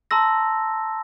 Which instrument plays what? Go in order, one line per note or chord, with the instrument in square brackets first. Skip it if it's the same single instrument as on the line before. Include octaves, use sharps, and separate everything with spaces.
[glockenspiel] A5 A#5 C6 E6 A#6